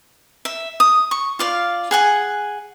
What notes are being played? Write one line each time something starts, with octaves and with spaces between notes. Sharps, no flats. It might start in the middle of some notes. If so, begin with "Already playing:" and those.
E5
D#6
C#6
F4 D5 F5
G#4 F#5 G#5